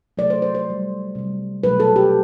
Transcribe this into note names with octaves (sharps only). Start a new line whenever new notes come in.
C3 F#3 A3 D5
C5
C5
C5
C3 G3
C3 G3
B2 F#3 A3 B4
A4
G4